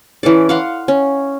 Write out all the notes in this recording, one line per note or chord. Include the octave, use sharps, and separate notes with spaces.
E3 C#4 A4 D5
F5 F#5 C6
C#4